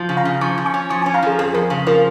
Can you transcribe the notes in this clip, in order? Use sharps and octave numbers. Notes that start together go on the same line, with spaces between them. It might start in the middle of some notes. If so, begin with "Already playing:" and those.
Already playing: F3
C#3
F5 A#5
C#3
F3 G#5 C#6
F3
G#5 C#6
C#4
F3 G#5 C#6
G#5 C#6
C#4
F5 A#5
F3 G#4
F2 G#4
F2 A#4
C#3
F3 A#4